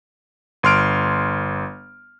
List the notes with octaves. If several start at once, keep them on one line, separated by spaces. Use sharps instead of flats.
G1 C6 F6 D7